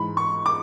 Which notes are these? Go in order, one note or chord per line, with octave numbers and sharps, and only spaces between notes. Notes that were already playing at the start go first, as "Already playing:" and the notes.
Already playing: G#2 E3 B5
C#6
D6